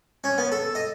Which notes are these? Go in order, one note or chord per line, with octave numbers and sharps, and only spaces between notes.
C#4
B3
A4
D#5